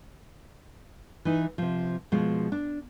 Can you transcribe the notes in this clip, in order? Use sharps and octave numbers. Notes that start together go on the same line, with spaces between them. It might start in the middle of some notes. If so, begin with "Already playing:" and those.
E3 D#4
C3 F3
B2 F3 G#3
D4